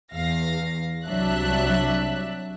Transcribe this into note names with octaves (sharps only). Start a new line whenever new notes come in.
E2 F5 A#6
C2 F#3 D4 E5 F#6